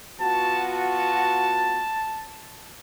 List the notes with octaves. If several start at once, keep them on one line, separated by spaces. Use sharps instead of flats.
B3 F4 F#4 A5
A5